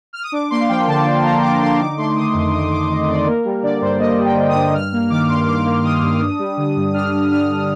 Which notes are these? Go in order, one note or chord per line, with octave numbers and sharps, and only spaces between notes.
F6
D#6
D4 D6
A#3 C6
F5
F3 G5
D3 A5
D4
A#3 A#5
F3 D6
D3 C6
D#4 D6
A3 C6
D#3 D#6
F2
D#4 D#6
A3 D6
D#3 D#5
F2 D5
A#3 A#4
G3
D3 D5
G2 C5
A#3 D#5
G3
G5
D3
D#6
G2
D#6
G2 F6
A#3
D#3 D6
G2 C6
G2 D6
A#3
D#3 D#6
G2
D4
G3
D3
G2
D4 F6
G3
D3 F6
G2